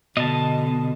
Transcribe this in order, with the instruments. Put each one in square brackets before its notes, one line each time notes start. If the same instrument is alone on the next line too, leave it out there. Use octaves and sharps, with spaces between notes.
[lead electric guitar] B2 [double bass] D3 [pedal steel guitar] D#5 A5